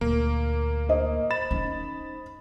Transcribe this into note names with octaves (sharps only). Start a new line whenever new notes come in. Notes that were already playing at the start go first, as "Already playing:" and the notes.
D2 A#2 A#3
C5 D#5
B5 A6 E7
C#4 D#4